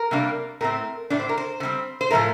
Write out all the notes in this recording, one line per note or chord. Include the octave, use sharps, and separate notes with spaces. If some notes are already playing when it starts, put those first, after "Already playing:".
Already playing: A#4
C3 G3 A#3 D4
A2 A3 C4 A#4
A2 A3 D4 D5
C5
A#4
C5
D3
G3 C4
C5
A2 F3 A3 A#4